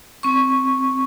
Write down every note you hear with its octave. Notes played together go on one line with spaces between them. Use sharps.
C4 C#6